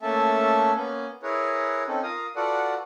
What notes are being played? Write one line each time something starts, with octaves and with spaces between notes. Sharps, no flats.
A3 A#3 C#4 A4 E5 A5
A#3 B3 C#4
E4 G#4 A#4 B4 C#5
C4 C#4 D#4 A4
F4 A#4 F5 D#6
F4 F#4 A4 B4 D5 F#5